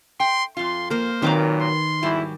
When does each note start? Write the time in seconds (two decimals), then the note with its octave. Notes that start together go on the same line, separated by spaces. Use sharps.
0.20 G5 C6
0.57 F2 F4 C6
0.90 A#3 A#4 C5
1.22 A#2 D#3 F#3 C4 B4 A#5 D6
1.62 C6
2.03 E2 G#2 F#3 G3 E4